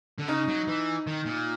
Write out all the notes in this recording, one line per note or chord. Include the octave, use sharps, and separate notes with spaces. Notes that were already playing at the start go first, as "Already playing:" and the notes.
D3
C#3 D#4
F#3
E3
D#3
A#2